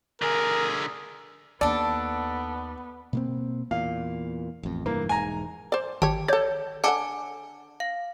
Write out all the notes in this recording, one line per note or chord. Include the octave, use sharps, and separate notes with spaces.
D3 G#4 A#4
D#2 B3 D4 A4 D5
B2 A#3 C4
E2 A#2 F5
A1 F2
F1 G2 E3 A#3
E1 G#2 G#5 A#5
C5 D5
G#1 G4 C#5 A5
A4 C#5 D5 G6
D3 A4 F#5 G#5 A5 D6
F5